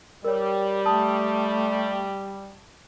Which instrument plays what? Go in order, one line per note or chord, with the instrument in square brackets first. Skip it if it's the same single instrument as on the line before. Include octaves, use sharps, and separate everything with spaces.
[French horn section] G3 [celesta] A#4 C#5
[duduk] A3 [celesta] A5 D#6